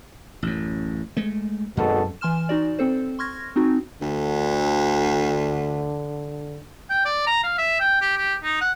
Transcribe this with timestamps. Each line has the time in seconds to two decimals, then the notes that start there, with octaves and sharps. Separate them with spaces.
0.43 A1 F#2
1.17 G#3 A3
1.77 G#1 F#2 B2 A4
2.21 E3 G#5 C6 F6 E7
2.49 D#4 F#4 D5
2.79 C4 A4 C5
3.19 C6 C#6 F6 G#6 A#6
3.56 C4 D#4 F#4
4.02 D2 D3
6.90 G5
7.05 D5
7.27 A#5
7.43 F5
7.58 E5
7.80 G5
8.01 G4
8.17 G4
8.43 D#4
8.61 F#5